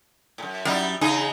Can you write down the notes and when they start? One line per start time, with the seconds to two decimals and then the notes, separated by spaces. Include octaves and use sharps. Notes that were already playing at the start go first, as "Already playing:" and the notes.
0.38 F#2 A2
0.65 F#2 G3 D#4 E4
1.01 C#3 E3 D#4 G#4